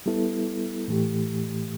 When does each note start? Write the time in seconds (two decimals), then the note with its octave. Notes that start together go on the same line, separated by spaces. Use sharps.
0.06 G3 B3 E4 A4
0.88 A2 E3 A3 G4